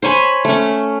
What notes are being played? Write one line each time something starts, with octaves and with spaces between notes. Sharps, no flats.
C5 C#5 G#5 B5
A3 C#4